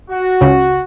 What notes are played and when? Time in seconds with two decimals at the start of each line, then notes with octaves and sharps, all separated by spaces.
0.11 F#4
0.41 C#2 C#3